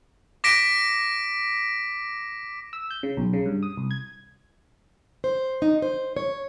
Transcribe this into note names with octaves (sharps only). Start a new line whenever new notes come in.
D6 A#6 B6 D7
E6
G6
C#3
B1
C#3
G2
D#6
C2
G#6
C5
D#4
C5
C#5